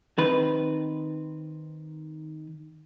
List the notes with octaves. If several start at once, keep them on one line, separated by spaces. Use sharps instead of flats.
D#3 C4 B4